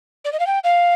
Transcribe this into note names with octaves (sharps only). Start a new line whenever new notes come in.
D5
D#5
F5
G5
F5